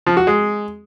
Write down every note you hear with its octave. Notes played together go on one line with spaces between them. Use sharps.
F3
F#4
G#3